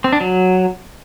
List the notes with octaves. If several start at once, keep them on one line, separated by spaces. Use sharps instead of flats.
C4
D4
F#3